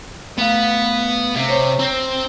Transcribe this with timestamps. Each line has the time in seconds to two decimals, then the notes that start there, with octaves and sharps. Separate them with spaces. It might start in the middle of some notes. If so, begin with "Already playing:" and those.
0.38 A3 B3 F5
1.35 C3
1.48 C5 C#5
1.79 C4 A#5